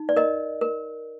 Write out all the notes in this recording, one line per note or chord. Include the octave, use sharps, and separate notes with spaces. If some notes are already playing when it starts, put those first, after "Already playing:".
Already playing: D#4
D5
A#4 D#5
A#4